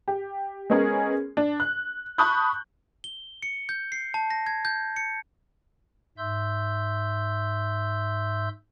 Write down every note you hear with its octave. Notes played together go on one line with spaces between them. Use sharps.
G4
G#3 B3 C#4 G#4 A#4
D4
F#6
A5 B5 C#6 D#6 F#6 G6
G7
C#7
G6
C7
A5
A#6
G#6
G6
C#7
G#2 E5 C6 E6 G6